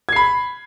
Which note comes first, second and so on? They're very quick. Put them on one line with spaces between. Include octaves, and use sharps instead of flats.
G#6 C7 B5